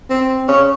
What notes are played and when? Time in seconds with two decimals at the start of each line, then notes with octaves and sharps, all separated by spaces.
0.10 C4
0.48 C#4